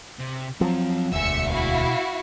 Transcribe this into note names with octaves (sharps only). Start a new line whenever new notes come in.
C3
F3 F#3 C4 F4
E1 D2 B2 E5 G#5 E6 C#7
E4 F#4 F5